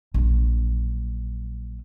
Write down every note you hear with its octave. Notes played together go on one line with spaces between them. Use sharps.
A#1 F#3